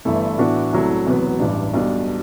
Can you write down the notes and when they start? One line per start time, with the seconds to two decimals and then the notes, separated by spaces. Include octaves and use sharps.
0.05 G1 G2 E3 A3 E4
0.38 A2 E3 B3 D4 F#4
0.73 C2 C3 F#3 A3 E4
1.06 E1 E2 C3 F#3 B3
1.40 A1 G2 E3 G3 D4
1.74 B1 B2 G3 D4